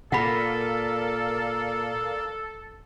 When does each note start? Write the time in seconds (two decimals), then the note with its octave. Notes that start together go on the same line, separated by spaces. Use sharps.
0.12 A#2 A4 A#4 D5 F5 F#5 B5